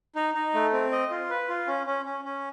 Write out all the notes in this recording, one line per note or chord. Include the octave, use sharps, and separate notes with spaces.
D#4
D#4
A3
C4
D#5
F4
B4
F4
C#4
C#4
C#4
C#4